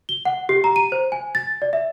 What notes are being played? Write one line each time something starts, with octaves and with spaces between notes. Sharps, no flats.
G7
F#5
G4
A#5
D#7
C5
G#5
A6
D5
E5